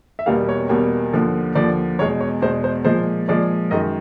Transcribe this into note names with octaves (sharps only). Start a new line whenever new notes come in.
E5
E2 B2 G3 A#3 F5
C#5
E2 B2 G3 A#3
D#2 D3 F3
D#2 D3 F3 D5
E2 B2 G#3 C#5
C#5
E2 B2 G#3 C5
C5
A#2 F3 G#3 C5
A#2 F3 G#3 D5
F#2 D#3 G#3 D#5